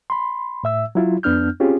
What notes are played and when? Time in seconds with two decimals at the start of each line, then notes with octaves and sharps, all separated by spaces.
0.10 B5 C6
0.64 A2 E5 E6
0.95 F#3 E4 F4
1.23 F2 B3 D4 F6 G6
1.60 C4 C#4 F4 G4 G#4